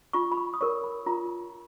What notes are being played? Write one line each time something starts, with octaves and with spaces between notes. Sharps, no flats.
F4 C#6
B5
C#6
D#6
A#4 C#5 C#6
B5
F4 A#5